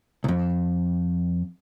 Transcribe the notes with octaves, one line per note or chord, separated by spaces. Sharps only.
C2 F2